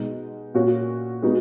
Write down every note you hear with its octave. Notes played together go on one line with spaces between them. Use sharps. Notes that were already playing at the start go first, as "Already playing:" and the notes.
Already playing: B2 G#3 D#4
A#2 A#3 C#4 F#4
G#3 B3 D#4 F#4